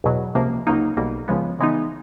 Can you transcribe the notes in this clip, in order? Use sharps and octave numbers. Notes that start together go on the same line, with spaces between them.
E2 B2 F#3
C#2 C3 F3 A#3
C#2 C#3 F#3 A#3 D#4
B1 B2 G3 A#3
C#2 C#3 F3 G#3 B3
C#3 E3 G#3 B3 D#4